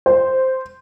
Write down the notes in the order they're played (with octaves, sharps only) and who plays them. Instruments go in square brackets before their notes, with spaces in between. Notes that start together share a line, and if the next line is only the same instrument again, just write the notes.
[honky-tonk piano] C5